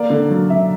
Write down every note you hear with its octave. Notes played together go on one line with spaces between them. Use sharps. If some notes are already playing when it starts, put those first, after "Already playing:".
Already playing: A#3 D5
D3
F#3
D3 E5